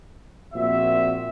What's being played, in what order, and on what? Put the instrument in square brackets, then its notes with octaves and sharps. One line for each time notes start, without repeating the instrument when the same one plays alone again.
[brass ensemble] A#1 A#2 C4 F#4 E5